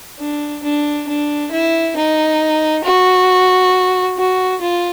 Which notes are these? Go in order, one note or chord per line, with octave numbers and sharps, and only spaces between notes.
D4
D4
D4
E4
D#4
F#4
F#4
F4